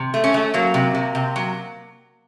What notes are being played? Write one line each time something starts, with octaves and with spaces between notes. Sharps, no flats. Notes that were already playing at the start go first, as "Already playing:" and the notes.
Already playing: C3
A3
C#4
A3
F#3 A#3
C3
C3
C3
F#3